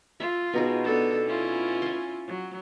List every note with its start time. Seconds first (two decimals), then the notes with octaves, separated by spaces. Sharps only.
0.20 F4 E5
0.53 B2 D#4 G#4
0.84 B3 D4 A4
1.26 C#4 E4 F4
1.82 G#5 C6
2.28 F#3